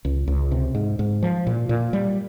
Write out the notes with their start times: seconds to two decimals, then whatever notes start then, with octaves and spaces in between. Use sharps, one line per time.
0.05 C#2
0.28 C#2
0.51 C3
0.75 G#2
0.99 G#2
1.23 F3
1.47 A#2
1.69 A#2
1.93 G3